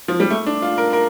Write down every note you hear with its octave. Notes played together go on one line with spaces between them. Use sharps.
F3
G3
A3
D4
F4
A#4
A#4